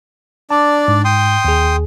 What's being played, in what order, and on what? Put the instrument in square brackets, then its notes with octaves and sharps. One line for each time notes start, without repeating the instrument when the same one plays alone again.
[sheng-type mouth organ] D4 D5 [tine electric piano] A5
[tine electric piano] G#2
[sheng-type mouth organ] G5 C6 D#6
[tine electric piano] D#2 G#4